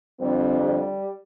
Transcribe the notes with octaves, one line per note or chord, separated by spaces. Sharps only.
F2 D3 G3 C4
G3